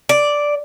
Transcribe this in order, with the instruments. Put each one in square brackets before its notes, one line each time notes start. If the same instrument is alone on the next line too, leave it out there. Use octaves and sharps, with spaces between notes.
[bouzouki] D5